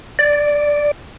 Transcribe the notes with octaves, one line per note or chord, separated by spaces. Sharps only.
D5